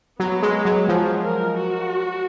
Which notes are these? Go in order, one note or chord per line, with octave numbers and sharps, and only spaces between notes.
F#3 B3
G#3
F#3
F3 G#4
A#4
F#4